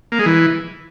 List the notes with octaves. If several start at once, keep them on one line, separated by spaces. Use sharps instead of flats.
A#3
G#3
E3